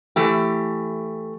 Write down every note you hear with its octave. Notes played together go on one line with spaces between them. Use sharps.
E3 A3 G4